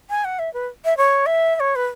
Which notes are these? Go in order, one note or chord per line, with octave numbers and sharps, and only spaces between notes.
G#5
F#5
E5
B4
E5
C#5
E5
E5
C#5
B4